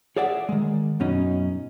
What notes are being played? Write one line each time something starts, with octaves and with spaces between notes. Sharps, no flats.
G#4 C#5 D5 E5 F#5
D#3 G#3
F#2 B2 C#4 D#4